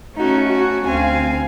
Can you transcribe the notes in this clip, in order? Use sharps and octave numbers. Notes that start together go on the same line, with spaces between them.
A3 C#4 D#4 F#4
F#4
D2 C4 F5 G#5